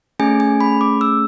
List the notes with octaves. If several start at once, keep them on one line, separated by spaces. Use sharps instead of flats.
A3 C#4 G#4 G#5
G#5
B5
D6
E6